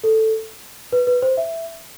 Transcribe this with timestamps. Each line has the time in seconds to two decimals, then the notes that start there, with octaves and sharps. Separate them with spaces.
0.04 A4
0.92 B4
1.07 B4
1.22 C5
1.37 E5